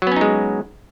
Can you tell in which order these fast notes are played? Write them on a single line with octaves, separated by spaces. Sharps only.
F#3 B3 C#4 D#4 G#3